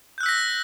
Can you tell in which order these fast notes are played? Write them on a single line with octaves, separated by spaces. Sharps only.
G6 F#6 E6 B6 A#6